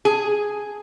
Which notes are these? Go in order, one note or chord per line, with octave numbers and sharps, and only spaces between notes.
G#4